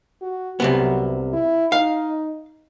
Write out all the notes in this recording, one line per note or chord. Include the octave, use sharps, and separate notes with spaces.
F#4
C2 C3 F#3 B3
E4
D#4 F5